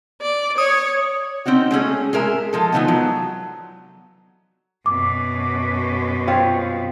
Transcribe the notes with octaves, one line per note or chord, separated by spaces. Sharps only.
D5
C#5 D#6
C4 C#4 D#4 F#4
G#3 A3 C#4 G#4
G#3 G#4 A#4 E5
F3 G#3 A4
E3 F3 B3 D#4 F4 F#4
F#3
F#2 B2 D6
C4 F4 C#5